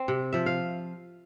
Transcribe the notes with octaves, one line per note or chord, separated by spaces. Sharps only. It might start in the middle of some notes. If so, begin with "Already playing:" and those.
Already playing: C4
C3
F3 E5
F5